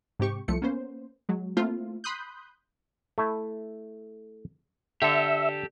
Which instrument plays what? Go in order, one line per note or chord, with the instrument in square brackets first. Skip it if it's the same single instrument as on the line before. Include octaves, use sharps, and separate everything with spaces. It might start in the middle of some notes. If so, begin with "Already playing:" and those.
[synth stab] G#2 C3 G4 C#6
C2 F3 A3 C#7
A#3 B3 C#4 C5
F#3 G#3
A3 A#3 C4 E4 F4
B5 C6 D#6 F#6 G6
[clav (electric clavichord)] A3 E4
[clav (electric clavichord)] D3 [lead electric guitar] G4 A4 [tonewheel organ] E5